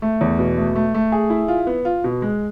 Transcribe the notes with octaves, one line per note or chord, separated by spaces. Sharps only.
A3
E2
B2
A3
A3
A3
G#4
E4
F4
B3
F4
B2
G#3